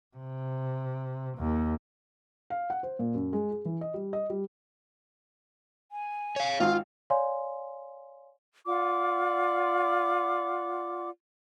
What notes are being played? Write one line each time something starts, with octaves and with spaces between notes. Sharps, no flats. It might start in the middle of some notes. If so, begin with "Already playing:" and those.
C3
D#2
F5
F#5
C5
A#2
F#2
G#3
G#4
E3
D#5
G3
D#5
G3
G#5
C#5 F5
G#1 F4 F5 F6
C#5 D5 F5 G#5 C6
F4 D5 F#5 D6